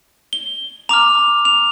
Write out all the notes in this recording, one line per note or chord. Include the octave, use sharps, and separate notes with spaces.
G7
A#5 D6 F6 F7
F7